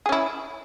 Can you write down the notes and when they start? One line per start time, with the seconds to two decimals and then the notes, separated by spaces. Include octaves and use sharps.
0.06 G#4
0.09 C#4
0.12 E4